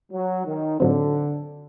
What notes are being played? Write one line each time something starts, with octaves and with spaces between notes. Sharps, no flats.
F#3
D#3
A2 D3 F#3 C4